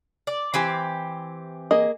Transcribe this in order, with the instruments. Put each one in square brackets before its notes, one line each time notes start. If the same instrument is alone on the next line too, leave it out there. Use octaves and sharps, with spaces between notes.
[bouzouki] D5
E3 C4 G4
[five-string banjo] A#3 G#4 D#5